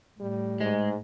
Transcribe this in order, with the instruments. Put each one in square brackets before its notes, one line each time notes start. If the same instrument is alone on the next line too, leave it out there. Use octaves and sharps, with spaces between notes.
[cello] A2 [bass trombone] G3
[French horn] G#2 [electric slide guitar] G#3